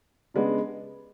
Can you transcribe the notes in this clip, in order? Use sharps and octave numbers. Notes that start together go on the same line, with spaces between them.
C#3 G#3 B3 D4